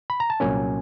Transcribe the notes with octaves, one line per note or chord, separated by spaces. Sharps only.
B5
A#5
A5
C2 A#2 F#3 A#3 C#4 G#5